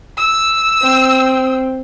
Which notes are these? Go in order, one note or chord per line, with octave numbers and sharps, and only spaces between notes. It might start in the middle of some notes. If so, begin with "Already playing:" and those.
E6
C4